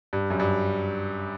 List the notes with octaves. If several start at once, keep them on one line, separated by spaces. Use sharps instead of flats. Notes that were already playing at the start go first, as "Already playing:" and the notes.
G2
F#2
G2